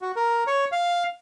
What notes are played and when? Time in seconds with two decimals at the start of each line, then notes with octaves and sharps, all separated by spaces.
0.02 F#4
0.16 A#4
0.47 C#5
0.72 F5